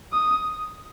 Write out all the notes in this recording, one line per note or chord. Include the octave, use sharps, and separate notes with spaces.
D#6